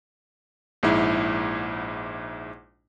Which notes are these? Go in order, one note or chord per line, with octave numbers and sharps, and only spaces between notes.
A#1 G#2 E4